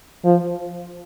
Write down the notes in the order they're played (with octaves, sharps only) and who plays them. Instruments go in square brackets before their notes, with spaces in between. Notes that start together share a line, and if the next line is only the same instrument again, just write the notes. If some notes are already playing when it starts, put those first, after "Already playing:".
[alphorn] F3